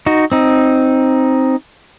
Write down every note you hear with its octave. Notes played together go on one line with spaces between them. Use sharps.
D#4 F#4
C4 D#4